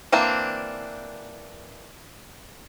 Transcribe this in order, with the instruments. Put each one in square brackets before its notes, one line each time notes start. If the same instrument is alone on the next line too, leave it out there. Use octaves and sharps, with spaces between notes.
[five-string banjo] E3 A#3 C4 D4